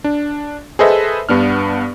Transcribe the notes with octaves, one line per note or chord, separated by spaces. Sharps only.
D4
G#4 A4 B4 C5 D#5 E5
G2 B3 D4 F6